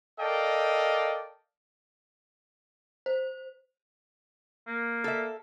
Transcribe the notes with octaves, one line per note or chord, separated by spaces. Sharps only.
A4 A#4 D5 D#5 F5 G5
C5
A#3
A4 E5